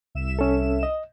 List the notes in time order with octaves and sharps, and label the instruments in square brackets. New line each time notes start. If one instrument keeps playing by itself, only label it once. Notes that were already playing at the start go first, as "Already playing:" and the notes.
[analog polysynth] C2 E5 E7
[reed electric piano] C#4 A4
D#5